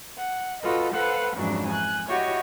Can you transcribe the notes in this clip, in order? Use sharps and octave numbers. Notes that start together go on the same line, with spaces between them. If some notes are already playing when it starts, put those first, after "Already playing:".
F#5
F4 F#4 A4 B4 D#5
A4 B4 C5 F5 F#5
F2 G#2 C#3 E3 F#3 D4
G#5 F#6
E4 F#4 G4 C#5 D#5